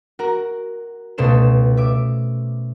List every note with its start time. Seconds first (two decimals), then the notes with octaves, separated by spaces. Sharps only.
0.19 F#4 A#4
1.18 C#2 B2 A3 C5 E7
1.77 E5 D6